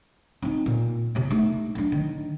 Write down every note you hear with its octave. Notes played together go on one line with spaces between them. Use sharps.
C4 D#4
A#2
E2 C3
A3 D#4
F#3 D4
D#3